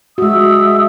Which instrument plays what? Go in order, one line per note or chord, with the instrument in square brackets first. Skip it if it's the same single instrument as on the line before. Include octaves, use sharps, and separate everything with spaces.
[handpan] G#3 F#4 [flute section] E5 D#6 E6